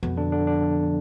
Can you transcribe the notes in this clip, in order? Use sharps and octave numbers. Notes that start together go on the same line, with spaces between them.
F2 B2 B3
D3 D4
D3 D4
D3 D4